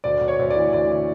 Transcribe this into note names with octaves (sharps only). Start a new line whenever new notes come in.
D2 D5
D2
C#5
D2
D5
E3
D2 D5